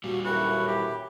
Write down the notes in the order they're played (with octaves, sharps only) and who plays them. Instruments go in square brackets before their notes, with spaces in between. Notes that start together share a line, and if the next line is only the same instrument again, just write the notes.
[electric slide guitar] A#2 G3 [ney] F#4
[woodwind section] F#2 A2 E3 [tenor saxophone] F#4 [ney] B5
[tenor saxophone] G4